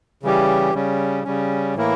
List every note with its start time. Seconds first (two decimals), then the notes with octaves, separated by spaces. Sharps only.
0.23 C#3 E3 G3 C#4 G4
0.74 C#3 G3 C#4
1.24 C#3 G3 C#4
1.75 A2 E3 A#3 E4 A#4